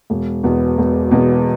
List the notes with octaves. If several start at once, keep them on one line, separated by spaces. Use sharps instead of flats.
E1
E2 B2 B3
E1
E2 B2 B3